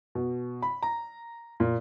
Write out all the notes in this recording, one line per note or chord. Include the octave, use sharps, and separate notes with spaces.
B2
B5
A#5
A#2